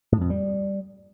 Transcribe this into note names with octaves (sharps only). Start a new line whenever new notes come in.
A2
F2
G3